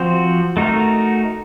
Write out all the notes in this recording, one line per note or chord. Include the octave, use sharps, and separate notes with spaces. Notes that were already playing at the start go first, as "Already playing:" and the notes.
Already playing: F3 C4 F#4 C5
A3 D#4 F#4 A#4